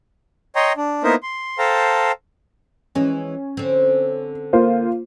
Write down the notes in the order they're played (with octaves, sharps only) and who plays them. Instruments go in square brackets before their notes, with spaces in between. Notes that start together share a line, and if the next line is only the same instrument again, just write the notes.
[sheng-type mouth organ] C#5 D#5 G5 A#5 C6
D4
A#3 B3 D#4 E4 A#4 C5
C6
A4 C5 F5 G5 A5 A#5
[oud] E3 G#3 [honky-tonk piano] C#4
[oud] D3 C4
[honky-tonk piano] A#3 F4 C5